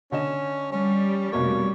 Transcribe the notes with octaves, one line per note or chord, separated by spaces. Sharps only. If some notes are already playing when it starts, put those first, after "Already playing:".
D3 C#4 D#5 E7
G3 C#4
F1 B2 A#3 C#5